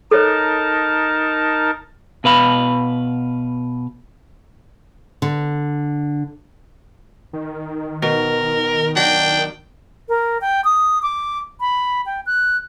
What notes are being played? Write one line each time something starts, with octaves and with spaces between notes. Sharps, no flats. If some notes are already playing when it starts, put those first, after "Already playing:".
D#4 A4 A#4 C#5 A5
B2 B4 F5 B5
D3
D#3
B2 A#4
F#3 D4 G5
A#4
G5
D#6
D6
B5
G5
F#6